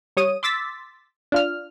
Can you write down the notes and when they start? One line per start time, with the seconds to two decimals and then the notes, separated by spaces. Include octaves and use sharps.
0.17 G3 C#5 D#6 D#7
0.43 C6 D6 E6 A6 B6
1.32 D4 F4 F6